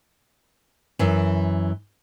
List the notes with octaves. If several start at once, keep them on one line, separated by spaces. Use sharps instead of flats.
F#2 E3